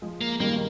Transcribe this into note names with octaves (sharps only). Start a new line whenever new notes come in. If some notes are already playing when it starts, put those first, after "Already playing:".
F3 G#3
A#3
D#3 G3 A#3